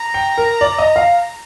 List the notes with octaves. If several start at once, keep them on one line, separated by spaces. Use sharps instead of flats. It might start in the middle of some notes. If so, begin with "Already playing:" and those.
Already playing: A#5
G5
A#4
D5
D#5
F5